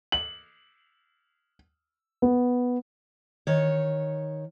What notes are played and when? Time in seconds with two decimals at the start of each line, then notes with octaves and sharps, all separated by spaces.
0.12 F#7
2.22 B3
3.47 D#3 C#5